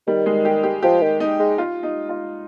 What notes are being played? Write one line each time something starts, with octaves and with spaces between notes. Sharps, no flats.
D#3 G3
G#3
G4
G4
F3 G4
D#3
D#4
G#3
F4
D#4
F4